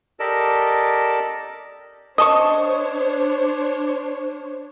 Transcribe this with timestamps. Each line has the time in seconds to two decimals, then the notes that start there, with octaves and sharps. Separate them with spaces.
0.20 G4 A4 A#4 D5 D#5 A5
2.18 D4 C5 C#5 D#5 A5 C#6